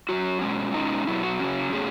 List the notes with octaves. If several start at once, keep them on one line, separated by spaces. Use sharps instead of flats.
F#2 D#3 F#3 F#4
B2 G#3 C#4
B2 G#3 C#4 D#4
B2 F#3 B3 E4
F#4
C#3 F#3 C#4
B2 A3 C#4 G#4